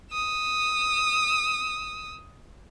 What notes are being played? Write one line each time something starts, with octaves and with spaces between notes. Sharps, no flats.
D#6 E6